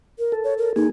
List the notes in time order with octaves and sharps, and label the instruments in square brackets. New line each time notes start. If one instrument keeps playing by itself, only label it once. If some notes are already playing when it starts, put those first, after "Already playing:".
[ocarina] A#4
[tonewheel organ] A4
[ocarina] C#5
A#4
[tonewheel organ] A#3 G#4 [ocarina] D#4